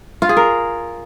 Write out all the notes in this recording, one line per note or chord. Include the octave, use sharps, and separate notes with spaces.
F4
G#4
A#4